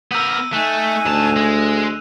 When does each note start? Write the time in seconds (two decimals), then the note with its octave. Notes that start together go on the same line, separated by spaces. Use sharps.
0.12 B3 A#4 E6 G6 D#7
0.53 A3 D#4 G#5 C#6 F#6 D#7 E7
1.06 D2 G#2 A5 F7
1.36 G#3